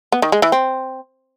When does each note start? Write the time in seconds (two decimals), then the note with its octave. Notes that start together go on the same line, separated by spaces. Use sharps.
0.12 B3
0.22 D#3
0.32 G#3
0.42 E3
0.52 C4